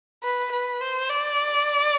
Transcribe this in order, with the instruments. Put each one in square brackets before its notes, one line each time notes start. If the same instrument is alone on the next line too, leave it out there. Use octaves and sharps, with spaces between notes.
[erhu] B4
B4
C5
D5